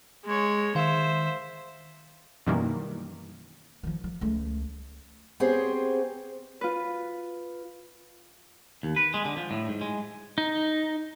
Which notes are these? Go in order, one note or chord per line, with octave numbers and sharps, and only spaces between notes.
G#3 C#5
D#3 C5 E5 F5
F#2 B2 D#3 E3 G3 A#3
D#3 F3
F3
C#2 A3
B3 C4 G4 G#4 C5 C#5
F4 B4
D#2
B4
G#3
D3
F3
A2
G#2
G#3
D#4